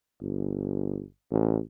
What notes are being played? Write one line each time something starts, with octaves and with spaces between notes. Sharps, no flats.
G1
A1